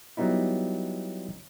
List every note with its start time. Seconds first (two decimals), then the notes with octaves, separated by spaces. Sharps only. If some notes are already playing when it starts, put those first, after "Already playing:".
0.17 F#3 G3 B3 D#4 E4